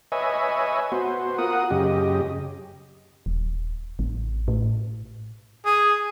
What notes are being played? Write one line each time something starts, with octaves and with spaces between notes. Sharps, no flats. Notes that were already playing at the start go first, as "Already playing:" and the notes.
B4 C#5 D#5 E5 G#5
B3 F#4 C5
F4 A#4 F#5 D#6
F#2 C#3 G4 D#5
D#1
A1
A2
G#4